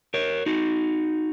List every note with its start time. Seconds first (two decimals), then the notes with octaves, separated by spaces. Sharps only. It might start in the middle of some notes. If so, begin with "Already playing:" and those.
0.14 A#4 C#5
0.46 D#4 F#4